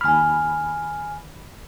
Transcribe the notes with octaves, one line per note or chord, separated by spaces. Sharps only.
D#2 G#5 B5 F6